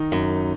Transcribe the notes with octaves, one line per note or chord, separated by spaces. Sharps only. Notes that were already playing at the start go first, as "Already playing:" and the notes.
Already playing: D#3 D#4
F#2